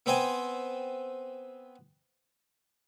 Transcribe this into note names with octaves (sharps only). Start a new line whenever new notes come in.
B3 C4 C5 G5 G#5